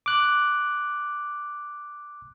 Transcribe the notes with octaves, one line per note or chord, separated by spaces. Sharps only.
D6 F#6